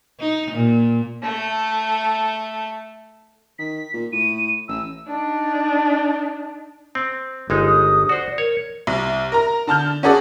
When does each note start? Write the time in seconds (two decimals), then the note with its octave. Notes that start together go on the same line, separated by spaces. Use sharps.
0.20 D#4
0.52 A#2
1.23 A3 A4
3.59 D#3 B6
3.94 A#2
4.13 A2 D#7
4.68 A1 E6
5.08 D4 D#4
6.95 C4
7.50 G1 G#3 D#4 B4
7.67 D#6
8.09 F#4 C5 D5
8.38 A#4 C#5
8.87 C2
9.32 A#4 A#5
9.67 D3 A5 F6 G6
10.03 C#4 F#4 G#4 A4 D5